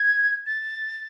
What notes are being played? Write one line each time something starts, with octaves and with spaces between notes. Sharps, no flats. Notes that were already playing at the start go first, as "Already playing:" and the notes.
Already playing: G#6
A6